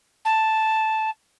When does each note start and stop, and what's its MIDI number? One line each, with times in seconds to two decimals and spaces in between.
0.25 1.10 81